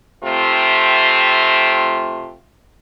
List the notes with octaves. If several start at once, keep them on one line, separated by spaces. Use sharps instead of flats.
C3 A3 C4 F4